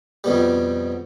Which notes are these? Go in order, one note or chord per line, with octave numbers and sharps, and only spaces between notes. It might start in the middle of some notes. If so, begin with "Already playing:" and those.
F2 B2 G3